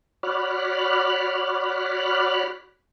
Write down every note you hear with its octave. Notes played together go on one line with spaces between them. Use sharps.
F#4 C#5 D5 B5 F6 F#6